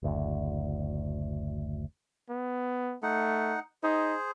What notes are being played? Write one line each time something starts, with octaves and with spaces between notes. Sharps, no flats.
F#1 D2
B3
A3 D#4 F#5
D#4 G#4 C5